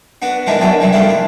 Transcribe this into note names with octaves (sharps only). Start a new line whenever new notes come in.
B3 D4 F#4
B2 D#3 G#3 D4 E4
F#2 E3 F#3 D4 G5
G2 C3 E3 G3
F3 G3 A3 A#3 D4 E4
D4